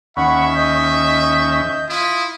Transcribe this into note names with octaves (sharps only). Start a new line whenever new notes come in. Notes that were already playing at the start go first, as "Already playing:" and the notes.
D#2 C#4 E5 F#5 B5 C#6
D#5 G6
E4 F4 D#6